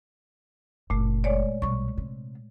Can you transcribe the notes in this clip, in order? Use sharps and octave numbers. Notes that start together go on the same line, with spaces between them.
F#1 A#2 A3
G#3 C#5 D5
B1 G3 C#6
C3